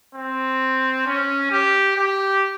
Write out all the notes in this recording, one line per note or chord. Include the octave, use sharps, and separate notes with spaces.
C4
C#4
G4
G4